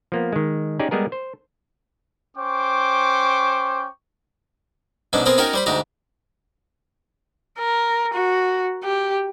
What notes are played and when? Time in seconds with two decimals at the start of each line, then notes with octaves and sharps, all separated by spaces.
0.12 F3 A#3 B3
0.33 D#3 G#3
0.79 C#4 D#4 G4 G#4 D5
0.91 G3 G#3 B3 G#4 A#4
1.12 C5
2.37 C#4 C5 G5 C#6 D6
5.13 G#2 B2 F#3 C#4 D4
5.26 B3 C4 G#4 A#4 C5
5.38 C#4 D#4 F#4 A#4 C#5 G5
5.54 G3 C5 B5
5.66 D2 G#2 F#4 G4 A#5
7.59 A#4
8.14 F#4
8.84 G4